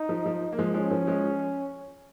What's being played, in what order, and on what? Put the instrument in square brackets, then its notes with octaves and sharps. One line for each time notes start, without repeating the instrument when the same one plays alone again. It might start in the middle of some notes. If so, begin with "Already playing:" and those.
Already playing: [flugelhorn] D#4
[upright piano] F3
F3
A#3
F3 G#3
[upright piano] F3 G#3 [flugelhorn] C#4
[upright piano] F3
F3 G#3